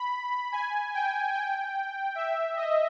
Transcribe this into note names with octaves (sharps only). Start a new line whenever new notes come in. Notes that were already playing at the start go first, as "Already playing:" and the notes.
Already playing: B5
G#5
G5
G5
E5
D#5